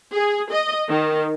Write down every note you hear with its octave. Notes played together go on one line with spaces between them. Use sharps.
G#4
D#5
D#3